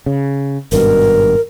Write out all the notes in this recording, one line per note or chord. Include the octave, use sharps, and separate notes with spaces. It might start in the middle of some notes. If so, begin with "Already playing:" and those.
C#3
G#1 G2 B2 A#4